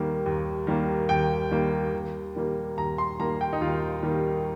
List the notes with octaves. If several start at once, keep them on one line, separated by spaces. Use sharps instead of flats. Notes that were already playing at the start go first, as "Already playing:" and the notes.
Already playing: D#2 D#3 G3 A#3
D#2
D#3 G3 A#3
D#2 G5
D#3 G3 A#3
D#2
D#3 G3 A#3
D#2 A#5
C6
D#3 G3 A#3 A#5
G5
D#4
D#2 F4
D#3 G3 A#3